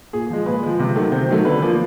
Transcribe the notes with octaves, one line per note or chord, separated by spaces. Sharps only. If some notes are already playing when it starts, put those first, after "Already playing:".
A#2 G#4
F3 G#3
A#2 B4
F3 G#3
C3
D#3 F#3 A3
C3 C5
D#3 F#3 A3
D3 B4
F3 A#3